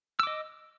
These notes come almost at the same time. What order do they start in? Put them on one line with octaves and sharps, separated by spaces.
E6 D6 D#5